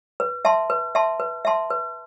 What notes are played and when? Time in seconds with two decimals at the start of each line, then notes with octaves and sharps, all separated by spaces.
0.20 B4
0.45 E5 A5 C6
0.70 B4
0.95 E5 A5 C6
1.20 B4
1.45 E5 A5 C6
1.70 B4